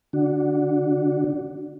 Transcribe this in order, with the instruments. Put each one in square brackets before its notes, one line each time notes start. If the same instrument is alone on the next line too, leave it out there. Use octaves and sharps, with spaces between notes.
[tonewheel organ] D3 D4 F#4